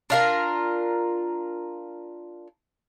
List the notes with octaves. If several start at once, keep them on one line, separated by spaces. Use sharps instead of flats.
D4 F4 A#4